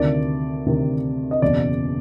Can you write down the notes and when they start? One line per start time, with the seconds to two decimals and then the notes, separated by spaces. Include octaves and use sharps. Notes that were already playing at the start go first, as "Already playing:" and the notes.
Already playing: D2 C3 D#3 D5
0.66 D2 C3 D#3
1.31 D#5
1.42 F#1 E2 B2 D5